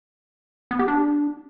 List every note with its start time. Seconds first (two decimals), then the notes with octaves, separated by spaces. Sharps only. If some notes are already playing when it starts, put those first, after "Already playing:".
0.71 B3
0.79 G4
0.88 D4